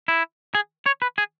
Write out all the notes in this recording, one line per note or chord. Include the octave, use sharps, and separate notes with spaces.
E4
G#4
C#5
B4
G#4